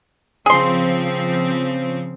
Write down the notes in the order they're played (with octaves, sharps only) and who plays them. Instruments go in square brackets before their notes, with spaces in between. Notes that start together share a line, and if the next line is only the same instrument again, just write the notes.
[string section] C#3 F3 C4 [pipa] G#4 C6